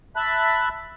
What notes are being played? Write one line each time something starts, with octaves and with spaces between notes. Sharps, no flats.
E5 A5 B5 F#6